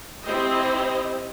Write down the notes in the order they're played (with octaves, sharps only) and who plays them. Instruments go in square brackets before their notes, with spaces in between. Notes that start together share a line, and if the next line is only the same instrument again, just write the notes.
[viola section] C4 E4 G4 C5 D#5